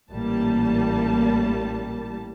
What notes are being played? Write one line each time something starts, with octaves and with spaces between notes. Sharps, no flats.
A1 A#2 G3 A#3 A5